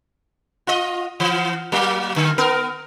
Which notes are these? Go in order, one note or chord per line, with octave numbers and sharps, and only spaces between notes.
F4 D#5
E3
F#3 A#3
D3
B3 A#4